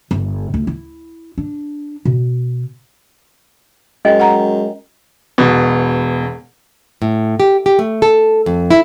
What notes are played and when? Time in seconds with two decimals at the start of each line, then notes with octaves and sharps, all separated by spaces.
0.11 G1
0.54 D2
0.67 E4
1.38 D4
2.05 B2
4.05 F#2 G#3 D#5 G5 G#5
4.19 F#5 A#5
5.38 E1 B2
7.02 A2
7.40 G4
7.66 G4
7.79 A3
8.02 A4
8.46 F2
8.71 E4